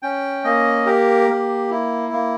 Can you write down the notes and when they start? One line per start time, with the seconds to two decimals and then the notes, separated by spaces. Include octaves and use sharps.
0.02 C#4 G5
0.44 A#3 D#5
0.86 G4 A#4
1.29 A#3
1.70 E4
2.13 A#3